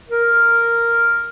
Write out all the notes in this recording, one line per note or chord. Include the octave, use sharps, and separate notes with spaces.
A#4